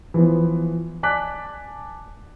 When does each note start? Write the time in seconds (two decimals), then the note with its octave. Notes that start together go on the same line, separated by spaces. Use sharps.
0.14 E3 F3 B3
1.03 D5 G#5 A5 D6 F#6 B6